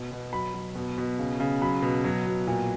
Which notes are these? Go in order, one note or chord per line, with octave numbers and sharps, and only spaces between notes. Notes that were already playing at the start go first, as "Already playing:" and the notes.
Already playing: B2
B2
F#3 B5
F#3
B2
B2
C#3
C#3
F#3 B5
B2
F#3
B2
A#2